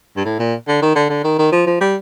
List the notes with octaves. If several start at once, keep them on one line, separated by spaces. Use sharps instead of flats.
G2
A2
A#2
D3
D#3
D3
D3
D#3
D#3
F3
F3
G3